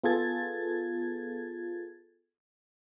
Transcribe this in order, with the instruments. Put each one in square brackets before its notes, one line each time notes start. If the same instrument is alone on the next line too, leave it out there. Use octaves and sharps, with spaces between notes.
[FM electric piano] B3 F4 G#4 A4 G#6 A6